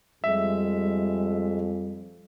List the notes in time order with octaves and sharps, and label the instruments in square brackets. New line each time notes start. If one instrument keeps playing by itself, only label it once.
[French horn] F2 [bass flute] G3 [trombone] G#3 [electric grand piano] E5